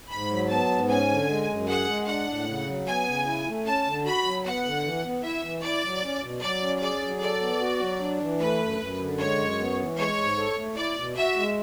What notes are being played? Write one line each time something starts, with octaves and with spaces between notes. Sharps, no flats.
G#2 B5
F#3
B3 A5
G#2
C#4 G#5
D3
G#3
F#2
G#4 F#5
G#3
D4 F#5
A2
C#3
F#3
B3 G#5
C#3
E4
A3
C#4 A5
D3
F#4 B5
F#3
B3 F#5
D3
E3
B3
E4 E5
E3
E4 D5
F#3
C#4
B2
F#3 D5
C#4
G#4 D5
F#3
A4 D5
B3
F#4
F#3
D4
E3
A3 B4
F#2
F#2
D3
G#3 C#5
F#2
B3
E3
G#3 C#5
G#2
A4
A3
E4 D5
B2
F#4 E5
G#3